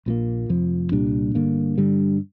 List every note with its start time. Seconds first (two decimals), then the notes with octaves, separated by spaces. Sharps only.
0.06 A#1 A#2 A#3
0.49 F1 F2 F3
0.92 C2 A#2 G3 D4
1.35 G1 G2 D3 A#3
1.78 G2 D3 G3